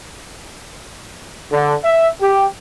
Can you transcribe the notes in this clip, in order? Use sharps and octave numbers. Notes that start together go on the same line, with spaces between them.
D3
E5
G4